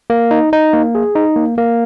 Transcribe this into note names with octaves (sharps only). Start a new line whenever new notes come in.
A#3
D#4
D#4
A#3
G#4
D#4
A#3
A#3